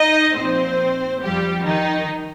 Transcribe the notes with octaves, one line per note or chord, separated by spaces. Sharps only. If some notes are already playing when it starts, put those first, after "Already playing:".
Already playing: D#4 D#5
A#2 F3 C4 C5
F2 F3 G3 G4
D#3 D#4